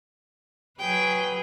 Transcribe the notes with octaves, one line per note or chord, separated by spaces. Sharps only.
F#3 G#4 B4 G5